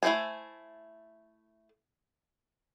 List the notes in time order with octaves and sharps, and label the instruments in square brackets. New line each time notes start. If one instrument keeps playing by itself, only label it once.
[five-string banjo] A3 E4 A4 C5 G#5